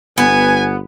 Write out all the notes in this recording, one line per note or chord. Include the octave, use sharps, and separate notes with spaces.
G1 B3 G#5